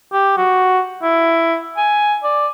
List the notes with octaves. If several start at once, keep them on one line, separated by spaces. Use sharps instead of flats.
G4
F#4
E4
G#5
D5